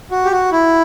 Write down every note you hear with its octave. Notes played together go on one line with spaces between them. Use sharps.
F#4
G4
F#4
E4